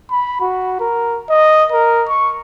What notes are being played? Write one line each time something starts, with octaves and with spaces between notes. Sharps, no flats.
B5
F#4
A#4
D#5
A#4
C#6